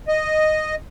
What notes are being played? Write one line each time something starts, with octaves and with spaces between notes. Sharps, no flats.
D#5